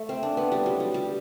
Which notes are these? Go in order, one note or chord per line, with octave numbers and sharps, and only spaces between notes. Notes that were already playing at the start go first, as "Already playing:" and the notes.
Already playing: A3
C4
D4
B3
G3
F#3
G3
G3